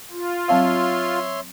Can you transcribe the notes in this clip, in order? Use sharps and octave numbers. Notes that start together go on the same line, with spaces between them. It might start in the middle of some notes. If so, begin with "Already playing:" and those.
F4
F#3 C4 C#5 E5 F5 C6